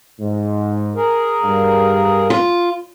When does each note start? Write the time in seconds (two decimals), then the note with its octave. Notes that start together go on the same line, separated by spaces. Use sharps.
0.20 G#2
0.96 G#4 A#4
1.44 G2 G3 F5
2.30 F4